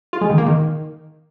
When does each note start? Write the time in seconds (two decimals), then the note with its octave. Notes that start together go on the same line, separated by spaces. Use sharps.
0.13 F4
0.21 G#3
0.30 D#3
0.38 A#3
0.46 D#3